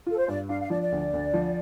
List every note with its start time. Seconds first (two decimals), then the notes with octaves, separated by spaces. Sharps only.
0.06 F4 A4
0.17 C5
0.28 G2 D5
0.49 D4 F5
0.61 F5
0.70 F3 D5
0.81 D5
0.92 D2
1.14 D2
1.34 F3